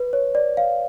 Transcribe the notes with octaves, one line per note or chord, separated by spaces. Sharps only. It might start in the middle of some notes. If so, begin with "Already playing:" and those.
Already playing: B4
C#5
D5
F5